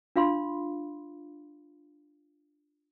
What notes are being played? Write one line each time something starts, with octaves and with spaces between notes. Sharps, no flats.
D4 F4 F5 B5 C6